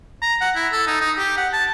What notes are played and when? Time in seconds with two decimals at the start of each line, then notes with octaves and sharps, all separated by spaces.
0.22 A#5
0.41 F#5
0.56 E4
0.72 A4
0.87 D#4
1.01 D#4
1.18 G4
1.37 F#5
1.53 A5